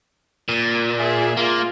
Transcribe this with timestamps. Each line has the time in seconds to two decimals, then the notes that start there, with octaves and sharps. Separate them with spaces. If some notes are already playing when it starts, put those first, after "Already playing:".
0.49 A#2
0.96 G#4 E5
1.37 A#3 F4